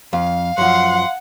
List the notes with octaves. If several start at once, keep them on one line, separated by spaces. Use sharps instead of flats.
F2 F5
F#2 F3 F#5 C6